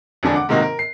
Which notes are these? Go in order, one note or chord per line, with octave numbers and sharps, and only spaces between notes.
E1 F2 D3 D4 G#5
F#5 D6
G#2 C3 D#3 A#3 D#4 F#4
A#4
C7